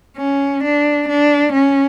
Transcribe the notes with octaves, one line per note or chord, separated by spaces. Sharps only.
C#4
D4
D4
C#4